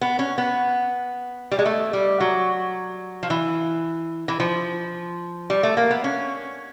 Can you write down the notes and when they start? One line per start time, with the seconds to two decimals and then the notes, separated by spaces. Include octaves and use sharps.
0.01 B3
0.19 C#4
0.38 B3
1.51 G3
1.59 G#3
1.66 A3
1.93 G3
2.20 F#3
3.23 F3
3.30 E3
4.28 E3
4.40 F3
5.50 G3
5.63 A3
5.77 A#3
5.91 B3
6.04 C#4